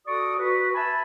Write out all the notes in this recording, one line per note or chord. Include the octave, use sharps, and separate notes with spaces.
F#4 A4 D5 C#6 D#6
F#4 B4
E5 G#5 A5 B5